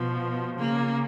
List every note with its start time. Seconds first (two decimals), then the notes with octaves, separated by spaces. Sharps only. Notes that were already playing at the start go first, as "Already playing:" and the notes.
Already playing: B2 F3
0.58 C#3 A#3